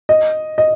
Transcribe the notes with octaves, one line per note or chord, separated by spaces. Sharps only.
D#5
D#5